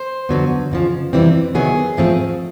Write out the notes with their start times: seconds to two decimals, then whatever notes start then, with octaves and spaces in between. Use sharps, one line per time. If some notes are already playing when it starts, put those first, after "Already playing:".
Already playing: C5
0.29 F2 D3 F#3 B3
0.71 F2 C#3 F3
1.13 F2 C3 E3 G3 C4
1.55 C3 D#3 F#3 B3 G#4
1.97 G#2 F3 A3 C4